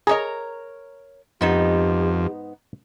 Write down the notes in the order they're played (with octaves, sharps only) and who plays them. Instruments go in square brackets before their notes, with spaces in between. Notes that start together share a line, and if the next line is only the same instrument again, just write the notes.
[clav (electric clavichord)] G#4 D#5 [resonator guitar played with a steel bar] A#4 C#5 A#5
[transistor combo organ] F2 [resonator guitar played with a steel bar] G#2 B3 D#4 [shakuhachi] G4